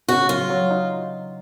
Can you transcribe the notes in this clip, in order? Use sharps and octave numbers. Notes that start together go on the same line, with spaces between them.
C#3 F#4
F#3 F4
F#3
D#4